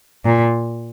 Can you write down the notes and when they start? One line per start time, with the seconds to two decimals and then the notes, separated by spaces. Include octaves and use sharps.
0.25 A#2